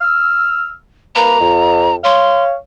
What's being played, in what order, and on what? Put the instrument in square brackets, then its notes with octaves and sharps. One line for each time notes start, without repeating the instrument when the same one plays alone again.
[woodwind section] E6 F6
[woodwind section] C2 A#3 B4 [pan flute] A#5
[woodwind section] F2
[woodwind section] C#5 F5 [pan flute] C6